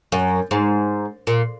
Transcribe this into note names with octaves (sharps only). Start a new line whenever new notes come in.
F#2
G#2
A#2